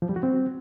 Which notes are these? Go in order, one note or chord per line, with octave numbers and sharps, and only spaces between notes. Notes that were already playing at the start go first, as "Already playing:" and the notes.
F3
G3
F#4
C4